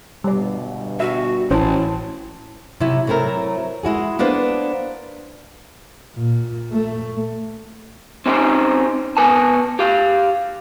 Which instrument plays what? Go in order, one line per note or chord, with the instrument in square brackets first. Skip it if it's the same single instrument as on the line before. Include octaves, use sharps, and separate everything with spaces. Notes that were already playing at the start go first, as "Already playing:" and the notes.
[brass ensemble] G1 G2 B2 [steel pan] G3 D5
[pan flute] F#4 [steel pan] E5
[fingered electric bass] A1 [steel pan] C#4 C5 C#5 [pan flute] E4 [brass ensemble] A5
[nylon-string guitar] C3 F#3 E4
F#3 A3 C4 E4 A#4
G#3 E4 F#4 G#4
A#3 B3 D4 B4 C5
[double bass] A#2
A3
[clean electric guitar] C4 C#4 D#4 G4 A#4 C5
B2 B4 G#5 A5
G4 F5